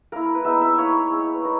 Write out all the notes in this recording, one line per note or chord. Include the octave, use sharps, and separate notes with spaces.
A#3 E4 A#4
B4
G#3 B3 D#4 E5
E5
A#3 E4 C#5
G#3 D#4
B4
D#4 A#4